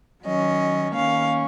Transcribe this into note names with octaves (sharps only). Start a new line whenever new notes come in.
D#3 F#3 C#4 D#5
D#3 A#3 C#4 F5